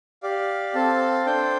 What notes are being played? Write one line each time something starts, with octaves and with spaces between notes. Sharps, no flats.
G4 D5 F5
C4 A4 F5 A5
D4 A4 C5 G5